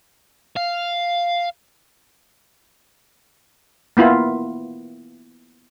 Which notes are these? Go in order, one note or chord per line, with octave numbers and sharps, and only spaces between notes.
F5
A#3 B3 E4 F4